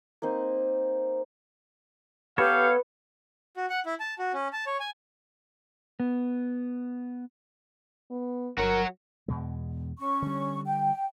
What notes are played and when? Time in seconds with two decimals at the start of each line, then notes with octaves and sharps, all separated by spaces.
0.22 A#3 C4 D#4 C5
2.38 B3 G4 A4 B4 C#5 F5
3.57 F#4
3.70 F#5
3.86 E4
4.00 A5
4.19 F#4
4.33 C#4
4.53 A5
4.67 C#5
4.80 G#5
6.00 B3
8.11 B3
8.58 G1 F#3 F#4 A#4 C#5
9.28 E2 B2 G#3
9.99 C#4 C#6
10.22 D3 G3
10.65 G5